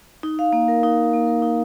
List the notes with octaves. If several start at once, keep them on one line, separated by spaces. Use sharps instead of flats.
D#4
F5
A#3
A#4
D#4
F5
A#3
A#4
D#4